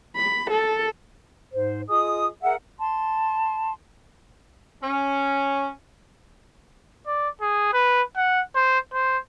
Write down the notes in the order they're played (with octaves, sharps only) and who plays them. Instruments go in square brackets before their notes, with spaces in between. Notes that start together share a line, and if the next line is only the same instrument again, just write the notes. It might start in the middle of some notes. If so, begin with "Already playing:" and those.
[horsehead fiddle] B5
A4
[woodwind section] G#2 C5
F4 G#4 D#5 D#6
G#4 A#4 E5 F#5
[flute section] A5 C6
[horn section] C#4
[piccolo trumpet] D5
G#4
B4
F#5
C5
C5